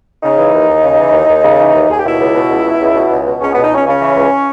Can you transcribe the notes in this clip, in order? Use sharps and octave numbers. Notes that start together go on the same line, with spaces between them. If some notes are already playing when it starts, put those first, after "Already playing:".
C#3 D#4
E3
D#2
D#2
C#3
E3
D#2
D#2
C#3
E3
D#2
D#2 G#4
G4
B2 E4
C#2
B2
C#2
B2
C#2
B2
C#2
B2
C#2 C#4
B2 B3
D#4
C#2 C#4
C#3 C#4
E3
C#2